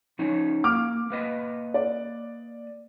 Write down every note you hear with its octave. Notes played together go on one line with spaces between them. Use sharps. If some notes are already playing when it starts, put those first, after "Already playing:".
F3 C#4 D#4
A#3 D6 F6
A#3 B4 D#5
D5